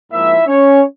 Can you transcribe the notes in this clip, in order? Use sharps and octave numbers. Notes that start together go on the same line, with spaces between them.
G#2 F3 A#3 E4 E5
C#4 C#5